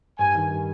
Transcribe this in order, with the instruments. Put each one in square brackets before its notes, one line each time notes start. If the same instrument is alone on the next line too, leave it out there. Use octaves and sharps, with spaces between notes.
[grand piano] G2 [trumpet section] G#5
[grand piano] D#3
G3